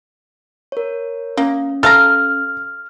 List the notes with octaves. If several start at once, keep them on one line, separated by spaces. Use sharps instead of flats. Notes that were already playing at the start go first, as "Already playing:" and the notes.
A#4 C#5
A#3 C#4
A4 F5 A#5 F6